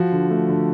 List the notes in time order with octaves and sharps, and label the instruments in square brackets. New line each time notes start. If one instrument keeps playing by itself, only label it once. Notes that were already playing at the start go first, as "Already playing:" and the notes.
Already playing: [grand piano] F3 F#4
D3
A3
D3